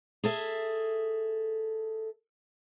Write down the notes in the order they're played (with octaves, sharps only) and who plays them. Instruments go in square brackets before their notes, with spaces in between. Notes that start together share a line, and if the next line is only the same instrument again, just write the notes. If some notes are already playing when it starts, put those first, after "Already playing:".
[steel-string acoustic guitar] G#4 A4 E5